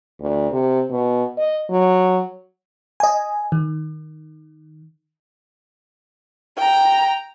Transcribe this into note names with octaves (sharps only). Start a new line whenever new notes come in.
D2
C3
B2
D#5
F#3
D#5 G#5
D#3
G5 A#5